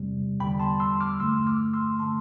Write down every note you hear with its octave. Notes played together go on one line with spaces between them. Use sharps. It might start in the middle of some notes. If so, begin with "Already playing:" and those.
Already playing: E2 C3 G3
E2 D3 G3 G5 B5
A5 C6
C6 E6
D6 F6
G2 D3 A3 C6 E6
D6 F6
C6 E6
D3 A3 A5 C6